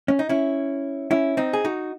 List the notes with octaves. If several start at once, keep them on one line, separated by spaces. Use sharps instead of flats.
C#4
D#4
C#4 E4
C#4 E4
C4 D#4
G#4
D#4 F#4